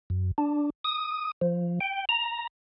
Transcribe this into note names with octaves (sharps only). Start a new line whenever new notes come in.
F#2
D4
D#6
F3
G5
A#5